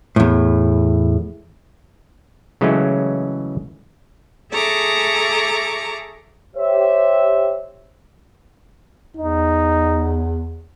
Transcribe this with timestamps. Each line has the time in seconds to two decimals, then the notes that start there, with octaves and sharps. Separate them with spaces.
0.16 E2 A2
2.61 C#3 E3 F#3 G#3 A3 C#4
4.51 G#4 A4 E5 A#5 C#6 D6
6.56 G4 C5 C#5 E5
9.16 E2 D#4